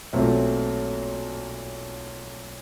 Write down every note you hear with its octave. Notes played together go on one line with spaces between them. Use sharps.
B1 A#2 F#3 A3 C4